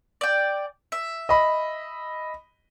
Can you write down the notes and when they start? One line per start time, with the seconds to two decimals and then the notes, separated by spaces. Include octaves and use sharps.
0.21 D5 G5
0.92 E5
1.29 D#5 B5